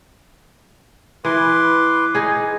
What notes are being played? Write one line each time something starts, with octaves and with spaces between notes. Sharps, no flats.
E3 B4 C6 D6
D#4 G#4